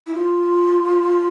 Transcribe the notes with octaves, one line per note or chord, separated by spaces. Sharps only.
E4
F4